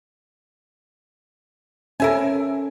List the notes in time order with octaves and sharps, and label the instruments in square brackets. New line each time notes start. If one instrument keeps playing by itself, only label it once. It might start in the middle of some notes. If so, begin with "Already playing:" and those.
[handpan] C#4 A4 [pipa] A#4 E5 G#5